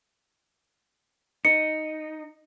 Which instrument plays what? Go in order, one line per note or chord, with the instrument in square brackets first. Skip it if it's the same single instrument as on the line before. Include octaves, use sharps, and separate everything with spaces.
[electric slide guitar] D#4 [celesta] C#7